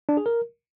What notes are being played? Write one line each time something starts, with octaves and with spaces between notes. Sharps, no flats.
D4
G#4
A#4